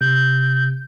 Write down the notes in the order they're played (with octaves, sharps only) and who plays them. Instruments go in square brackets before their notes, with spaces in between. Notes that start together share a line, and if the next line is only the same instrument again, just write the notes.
[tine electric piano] C3 [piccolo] G6